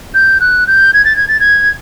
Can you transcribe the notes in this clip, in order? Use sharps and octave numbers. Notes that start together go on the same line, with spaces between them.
G6
F#6
G6
G#6
A6
G#6
A6
G#6